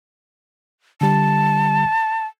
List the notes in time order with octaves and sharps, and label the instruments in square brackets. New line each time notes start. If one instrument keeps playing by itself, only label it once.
[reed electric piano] D3 G3 [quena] A5